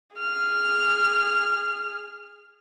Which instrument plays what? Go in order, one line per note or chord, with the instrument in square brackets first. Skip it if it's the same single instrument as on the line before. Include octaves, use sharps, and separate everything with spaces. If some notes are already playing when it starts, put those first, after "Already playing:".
[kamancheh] G#4 F6